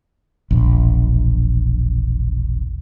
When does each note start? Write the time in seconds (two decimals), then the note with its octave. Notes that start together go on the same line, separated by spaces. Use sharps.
0.51 E1 A#1